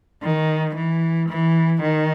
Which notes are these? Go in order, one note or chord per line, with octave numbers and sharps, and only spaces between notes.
D#3
E3
E3
D#3